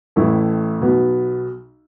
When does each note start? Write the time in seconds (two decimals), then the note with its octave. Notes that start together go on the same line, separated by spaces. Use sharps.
0.16 A1 A2 E3 A3 E4
0.81 B1 B2 B3